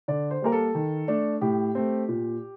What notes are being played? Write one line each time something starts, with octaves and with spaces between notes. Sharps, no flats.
D3 D5
C5
G3 A#3 A#4
A4
D#3
A3 D4
A2 G4
A3 C4
A#2